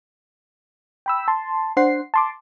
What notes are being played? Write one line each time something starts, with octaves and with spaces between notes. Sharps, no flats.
G5 B5 E6
A5 C6
D4 C5 F#5 C7
A5 C6 D6